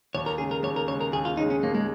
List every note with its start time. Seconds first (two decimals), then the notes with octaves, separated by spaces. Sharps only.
0.15 D#2 C#5
0.26 A#4
0.38 C#3 G#3 G#4
0.51 A#4
0.63 D#2 C#5
0.76 A#4
0.88 C#3 G#3 C#5
1.01 A#4
1.13 D#2 G#4
1.25 F4
1.37 C#3 G#3 D#4
1.50 C#4
1.63 D#2 A#3
1.75 G#3